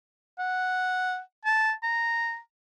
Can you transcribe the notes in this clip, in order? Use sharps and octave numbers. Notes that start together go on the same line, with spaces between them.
F#5
A5
A#5